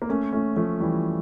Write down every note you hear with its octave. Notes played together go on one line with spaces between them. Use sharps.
A#3
A3 C#4
A3 C#4
F3 A3
E3 G3